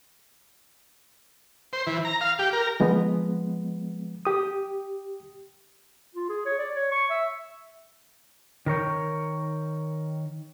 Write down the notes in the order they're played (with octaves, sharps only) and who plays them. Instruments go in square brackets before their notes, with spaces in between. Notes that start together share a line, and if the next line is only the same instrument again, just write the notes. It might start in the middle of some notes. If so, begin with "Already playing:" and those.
[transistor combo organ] C5
E3
A#5
F5
G4
A#4
[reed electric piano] F3 G#3 B3
G4 D#6
[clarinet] F4
G#4
C#5
D5
C#5
C#6
E5
[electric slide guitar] D#3 A#4 C#5 G5